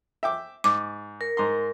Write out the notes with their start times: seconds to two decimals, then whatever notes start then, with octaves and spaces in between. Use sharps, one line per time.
0.23 E5 G5 D6
0.64 G#2 D6
1.21 A#4
1.37 G#2 A#5 C6